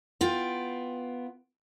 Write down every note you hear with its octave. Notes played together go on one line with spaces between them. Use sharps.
B3 F4 G5